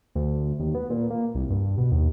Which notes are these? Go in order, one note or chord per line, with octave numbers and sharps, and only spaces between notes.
D2
D#2
B3
A#2
A#3
C2
G2
B2
D#2